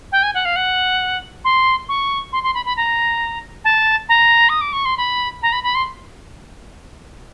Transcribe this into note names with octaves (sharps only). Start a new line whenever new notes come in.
G5
G#5
F#5
F5
F#5
C6
C#6
C6
C6
B5
B5
A#5
A5
A#5
D#6
D6
C#6
C6
B5
A#5
B5
B5
C6